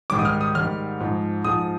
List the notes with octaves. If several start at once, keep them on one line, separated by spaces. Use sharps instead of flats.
G#2 D#3 G3 D6
D#6
F6
D#6
G#2 D#3 G3 F6
G#2 F3
G#2 F3 D#6